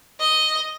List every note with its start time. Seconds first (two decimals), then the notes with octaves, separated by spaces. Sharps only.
0.20 D#5